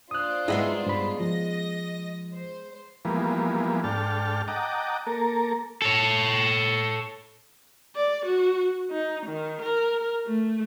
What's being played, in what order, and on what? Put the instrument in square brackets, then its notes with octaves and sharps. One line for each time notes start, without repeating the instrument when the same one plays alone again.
[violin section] D4 F4 C5 [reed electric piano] D#6 F#6
[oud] G#3 B3 D#4 [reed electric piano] E4 G#4 E5
[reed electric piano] G2 B5
[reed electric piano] F3 [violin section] D#5 A#6
[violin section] C5
[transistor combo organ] E3 F3 G3 G#3 A#3 B3
G#2 D4 A4 G5 A5 F6
D#5 F#5 G5 A5 A#5 D6
A#3 A4 A#4
[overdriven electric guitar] A4 C#5
[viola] D5
F#4
D#4
D#3
A#4
A3